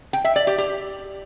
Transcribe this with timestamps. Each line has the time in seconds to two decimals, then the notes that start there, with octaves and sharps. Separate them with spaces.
0.13 G5
0.25 E5
0.36 D5
0.47 G4
0.58 G4